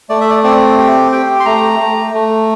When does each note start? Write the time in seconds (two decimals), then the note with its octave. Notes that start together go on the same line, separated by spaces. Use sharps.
0.09 A3 D5
0.21 E5
0.30 D5
0.44 C4 D5
0.78 G4
1.12 G4 G5
1.40 C6
1.46 A3 A#5
1.80 A3
2.14 A3